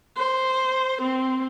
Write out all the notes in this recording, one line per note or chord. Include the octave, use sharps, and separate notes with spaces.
C5
C4